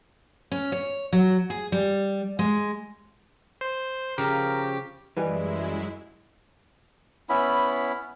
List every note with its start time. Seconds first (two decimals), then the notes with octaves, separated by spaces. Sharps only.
0.52 C#4
0.72 C#5
1.13 F#3
1.50 G#4
1.72 G3
2.39 G#3
3.61 C5
4.18 C#3 F3 G4 A#4
5.17 F#2 E3 G3 G#3 E4 B4 D#5 G#5
7.29 B3 C#4 E4 B5